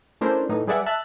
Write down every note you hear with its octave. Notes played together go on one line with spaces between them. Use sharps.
A3 C#4 D4 E4 A#4 C5
A2 E3 D#4
G3 G#4 B4 D5 E5 F#5
E5 A5 F#6